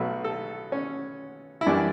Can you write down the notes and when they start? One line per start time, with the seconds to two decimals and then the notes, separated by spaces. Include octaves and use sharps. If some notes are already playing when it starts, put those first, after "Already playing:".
Already playing: B1 B2 F#3 A3 B4
0.24 A4
0.72 C#4
1.61 E4
1.66 F#2 E3 G3 D4